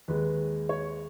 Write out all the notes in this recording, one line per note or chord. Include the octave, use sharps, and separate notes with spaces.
D#2 D#3 G#3 B4
C#5